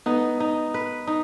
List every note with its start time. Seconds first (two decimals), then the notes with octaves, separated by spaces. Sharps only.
0.06 B3 D#4
0.40 D#4
0.74 B4
1.07 D#4